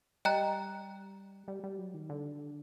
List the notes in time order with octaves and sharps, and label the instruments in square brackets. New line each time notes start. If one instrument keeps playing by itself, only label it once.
[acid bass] G3 [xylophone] D#5 G5 A#5 F#6
[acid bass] G3
G3
F#3
D#3
D3